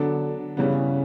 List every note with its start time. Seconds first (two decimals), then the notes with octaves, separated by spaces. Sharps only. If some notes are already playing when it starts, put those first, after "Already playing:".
Already playing: D3 F#3 B3 D4 A4
0.57 G2 C#3 E3 G3 B3